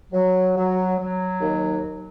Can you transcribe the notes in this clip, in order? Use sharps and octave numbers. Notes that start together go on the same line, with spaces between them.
F#3
F#3
F#3
D#2